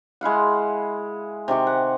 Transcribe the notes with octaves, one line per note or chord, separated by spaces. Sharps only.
G#3 E4 F5 F#5
C3 D#3 G4 C#6
F#5